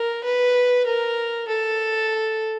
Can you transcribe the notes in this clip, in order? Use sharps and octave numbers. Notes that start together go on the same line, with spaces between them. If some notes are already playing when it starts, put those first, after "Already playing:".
Already playing: A#4
B4
A#4
A4